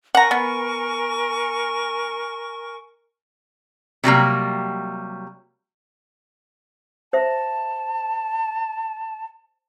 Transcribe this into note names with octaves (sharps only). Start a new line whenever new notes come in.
A#4 F#5 G#5 A#5 C#6
B3
C3 F#3 G3 A#3
C5 E5 A5